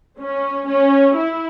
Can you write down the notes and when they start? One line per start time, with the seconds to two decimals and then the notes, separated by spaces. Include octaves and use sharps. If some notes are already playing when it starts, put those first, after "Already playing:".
0.20 C#4
0.68 C#4
1.16 E4